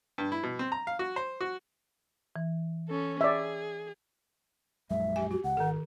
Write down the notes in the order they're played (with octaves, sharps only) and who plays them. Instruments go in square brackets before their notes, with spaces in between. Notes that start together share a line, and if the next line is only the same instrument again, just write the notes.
[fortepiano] G2
E4
B2
C4
A#5
F5
F#4
C5
F#4
[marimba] E3
[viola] C#4 A4
[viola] G#4 [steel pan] D5 E5
[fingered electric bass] A#1 F#2 G#3 [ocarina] E5
[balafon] G4 G#5
[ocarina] F#4 [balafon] G4
[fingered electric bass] C#2 [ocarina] F#5
[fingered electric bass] G#1 [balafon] D#3 A4